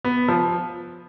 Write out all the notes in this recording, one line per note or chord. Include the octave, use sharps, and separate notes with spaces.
B3
F3